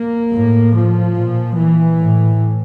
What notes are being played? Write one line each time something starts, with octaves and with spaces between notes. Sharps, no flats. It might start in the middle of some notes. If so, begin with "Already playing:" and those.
Already playing: A#3
A2
F3
A#2
E3
A2